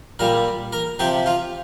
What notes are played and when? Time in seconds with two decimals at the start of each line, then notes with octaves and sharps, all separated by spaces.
0.19 A#2 G3 A#4
0.73 A#4
0.99 C3 F3 G4
1.26 F4